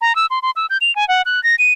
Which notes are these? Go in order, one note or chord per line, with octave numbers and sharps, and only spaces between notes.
A#5
E6
C6
C6
E6
G6
F7
G#5
F#5
F#6
A#6
D#7